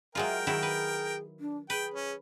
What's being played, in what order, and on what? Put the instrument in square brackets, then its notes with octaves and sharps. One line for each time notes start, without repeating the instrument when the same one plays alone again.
[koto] F#3 G#3 F4 [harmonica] A#4 G5 [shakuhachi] E5
[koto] D#3 F#3 E4 [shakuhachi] G#4
[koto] B4
[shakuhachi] D4
[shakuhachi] G#4 [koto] B4 [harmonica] G5
[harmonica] C#4